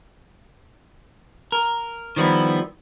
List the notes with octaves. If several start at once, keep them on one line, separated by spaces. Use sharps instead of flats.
A#4
D#3 F3 G3 B3 E4